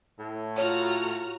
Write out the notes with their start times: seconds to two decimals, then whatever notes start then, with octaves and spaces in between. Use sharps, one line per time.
0.19 A2
0.58 F4 F#4 C#5 A#5 F6